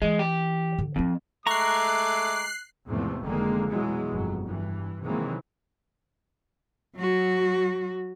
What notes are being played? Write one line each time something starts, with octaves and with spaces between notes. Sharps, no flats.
E3 G#3
G4
D3
F2 C4 E4
G#3 A3 A#5 C#6 D6 F#6 C7
E2 G#2 C3 F3 A3
F1 F2 D3 D#3 G#3 A#3
B2 E3 F#3 G#3
G1 F2 F#3
G2 E3
C3 D#3 E3 F#3 G#3 A#3
F#3 F#4